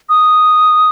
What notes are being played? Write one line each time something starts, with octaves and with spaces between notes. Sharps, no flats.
D#6